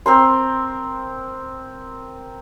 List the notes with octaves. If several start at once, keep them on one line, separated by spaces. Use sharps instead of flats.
C4 A#4 C6